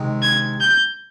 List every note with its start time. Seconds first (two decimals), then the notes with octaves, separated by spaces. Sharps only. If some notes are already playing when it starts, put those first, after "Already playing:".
Already playing: C3 D#3 G#3
0.22 G#6
0.61 G6